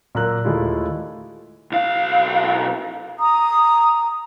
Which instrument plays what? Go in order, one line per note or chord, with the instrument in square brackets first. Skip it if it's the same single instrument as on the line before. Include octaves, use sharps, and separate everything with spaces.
[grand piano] A#2 F#3 A#3 A#5 E6 F#6
D#2 G#3 A3 E4 F4
[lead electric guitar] B1 F5
[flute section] A#5 D#6